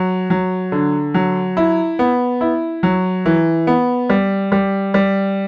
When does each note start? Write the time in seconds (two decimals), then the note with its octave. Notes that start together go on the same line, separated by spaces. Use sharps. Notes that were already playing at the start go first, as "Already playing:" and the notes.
Already playing: F#3
0.30 F#3
0.72 D3
1.14 F#3
1.57 E4
1.99 B3
2.41 E4
2.83 F#3
3.26 E3
3.67 B3
4.10 G3
4.52 G3
4.94 G3